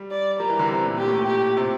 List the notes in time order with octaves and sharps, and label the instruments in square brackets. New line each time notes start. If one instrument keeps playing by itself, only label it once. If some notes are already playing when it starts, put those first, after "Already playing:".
Already playing: [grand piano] G3
[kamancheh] D5
[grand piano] G3 [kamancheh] A#4
[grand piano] E3
D3
C3
A#2
[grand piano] A#2 [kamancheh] G4
[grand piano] A2
A#2
[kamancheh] G4
[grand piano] C3